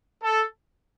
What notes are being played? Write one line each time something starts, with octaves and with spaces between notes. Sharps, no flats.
A4